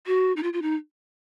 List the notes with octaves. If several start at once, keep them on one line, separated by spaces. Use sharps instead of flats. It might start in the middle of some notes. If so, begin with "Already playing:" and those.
F#4
D#4
F4
F4
D#4